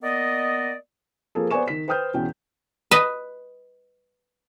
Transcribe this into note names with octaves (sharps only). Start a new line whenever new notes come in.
A#3 B3 D5 D#5
F3 A#3 G#4 A4
B3 C5 D5 G#5 C#6 E7
D#3 B6
B4 C5 G5 D#6 F6 G6
E2 B2 C#4 G5
B4 D#5